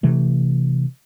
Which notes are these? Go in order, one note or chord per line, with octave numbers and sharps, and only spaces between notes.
C3 E3 A3